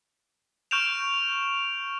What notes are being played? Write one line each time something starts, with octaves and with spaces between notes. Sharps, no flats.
C#6 F6 G6 D7 E7 F7